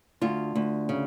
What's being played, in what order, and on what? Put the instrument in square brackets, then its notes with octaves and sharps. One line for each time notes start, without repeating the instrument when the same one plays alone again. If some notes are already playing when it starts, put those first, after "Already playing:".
[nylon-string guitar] D2 F4
D2
C#3